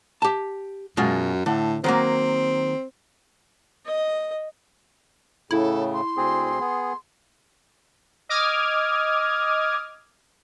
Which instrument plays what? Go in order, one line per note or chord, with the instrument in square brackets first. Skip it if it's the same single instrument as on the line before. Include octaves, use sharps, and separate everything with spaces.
[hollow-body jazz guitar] G4 A5
[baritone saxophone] F#2 [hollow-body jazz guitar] B2 G#3 F4
[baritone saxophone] A2 [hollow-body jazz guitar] D3
[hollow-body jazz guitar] D#3 F#3 A#3 [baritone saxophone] C4
[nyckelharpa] D#5
[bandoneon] A2 C#3 [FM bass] E4 [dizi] A4
[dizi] C6
[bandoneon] D2 C4 G#4
B3 G#4
[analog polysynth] D#5 D6 D#6 F6 G#6